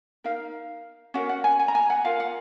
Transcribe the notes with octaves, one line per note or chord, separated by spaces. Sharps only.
D#4 A#4 F5
C#4 F#4 A#4 F#5
F#5
G#5
G#5
A#5
G#5
F#5
F4 A#4 F5
F#5